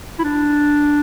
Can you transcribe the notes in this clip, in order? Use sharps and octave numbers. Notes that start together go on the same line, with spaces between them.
E4
D4